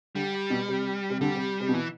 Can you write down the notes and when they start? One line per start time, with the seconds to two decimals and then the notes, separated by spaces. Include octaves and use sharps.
0.15 D3 G3
0.50 B2
0.68 C3
1.10 C3
1.21 D3 G3
1.35 C3
1.60 C3
1.69 B2
1.74 E3